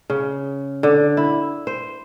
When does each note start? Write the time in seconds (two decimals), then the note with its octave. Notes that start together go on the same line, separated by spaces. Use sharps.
0.10 C#3
0.83 D3
1.17 E4
1.67 C5